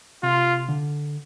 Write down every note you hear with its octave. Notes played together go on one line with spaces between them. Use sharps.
C3 F4
D3